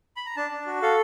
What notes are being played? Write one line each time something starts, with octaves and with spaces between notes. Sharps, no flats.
B5
A#5
D4 A5
D4
F#4
A4 F5